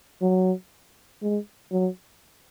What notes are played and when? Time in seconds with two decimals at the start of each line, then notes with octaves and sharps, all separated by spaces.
0.22 F#3
1.22 G#3
1.72 F#3